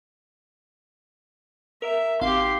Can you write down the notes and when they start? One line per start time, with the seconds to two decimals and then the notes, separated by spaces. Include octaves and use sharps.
1.82 A#4 E5
2.21 G#1 G4 F5 C6